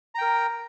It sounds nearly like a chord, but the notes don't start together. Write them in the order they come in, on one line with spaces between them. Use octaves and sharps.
A#5 G5 A#4